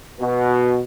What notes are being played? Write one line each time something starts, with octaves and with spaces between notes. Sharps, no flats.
B2